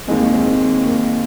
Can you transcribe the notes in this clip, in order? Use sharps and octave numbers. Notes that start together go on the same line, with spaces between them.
D#2 D#3 G#3 C4 D#4
A#3
C4
C4
A#3